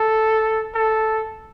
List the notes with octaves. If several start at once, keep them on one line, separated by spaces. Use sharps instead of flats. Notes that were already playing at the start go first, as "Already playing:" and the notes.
Already playing: A4
A4